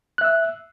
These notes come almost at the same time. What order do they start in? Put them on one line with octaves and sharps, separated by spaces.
F#6 E5 E6